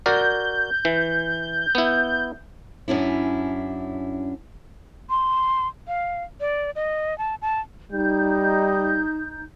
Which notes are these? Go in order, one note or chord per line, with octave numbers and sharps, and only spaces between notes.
F#4 A#4 D5 G6
E3
B3 E4
F#2 C#4 D4 E4
C6
F5
D5
D#5
A5
A5
G3 D#4 G6